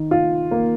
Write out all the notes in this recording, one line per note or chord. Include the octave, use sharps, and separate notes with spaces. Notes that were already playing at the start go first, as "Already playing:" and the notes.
Already playing: D#3
F4
A#3